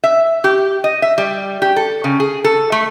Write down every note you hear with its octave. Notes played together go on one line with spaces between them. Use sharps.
E5
G4
D#5
E5
G3
G4
A4
C#3
G#4
A4
A3